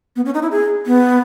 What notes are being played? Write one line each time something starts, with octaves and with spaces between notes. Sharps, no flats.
B3
C#4
D#4
E4
G#4
B3